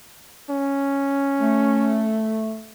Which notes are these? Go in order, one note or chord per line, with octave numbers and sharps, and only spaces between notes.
C#4
A3